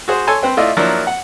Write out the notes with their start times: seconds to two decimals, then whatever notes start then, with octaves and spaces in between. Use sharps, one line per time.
0.08 F#4 G#4 C5
0.27 A4 C#5 G#5 A5 C6
0.43 C4 B4 C5 G5
0.57 A3 E4 F4 D5 D#5
0.77 F3 F#3 A#3 D4 E4
1.07 F#5